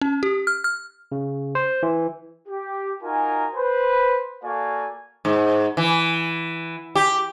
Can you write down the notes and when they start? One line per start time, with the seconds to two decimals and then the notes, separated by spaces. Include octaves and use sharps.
0.02 C#4
0.23 G4
0.47 F6
0.64 F6
1.12 C#3
1.55 C5
1.83 E3
2.48 G4
3.02 D#4 F4 F#4 A#4 G#5
3.55 B4 C5
4.44 A#3 F#4 A4 D5 F5 G#5
5.25 G#2
5.77 E3
6.95 G4